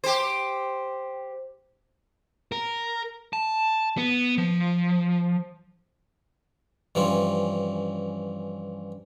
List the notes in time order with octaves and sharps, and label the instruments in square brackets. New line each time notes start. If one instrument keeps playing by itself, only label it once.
[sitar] G4 C5
[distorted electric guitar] A#4
A5
B3
F3
[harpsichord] G2 E3 F3 C#4